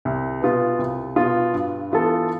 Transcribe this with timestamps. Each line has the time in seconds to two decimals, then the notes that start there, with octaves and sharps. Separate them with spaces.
0.05 C2
0.41 B2 B3 F4
0.79 C2
1.16 B2 B3 F4
1.54 G2
1.92 E3 B3 F4 A4